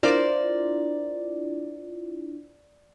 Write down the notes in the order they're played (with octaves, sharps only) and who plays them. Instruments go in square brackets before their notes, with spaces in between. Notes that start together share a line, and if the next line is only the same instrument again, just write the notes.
[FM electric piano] D4 E4 F4 [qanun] A#4 C5 [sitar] D5